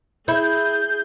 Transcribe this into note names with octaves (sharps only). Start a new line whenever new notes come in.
E4 G#4 G6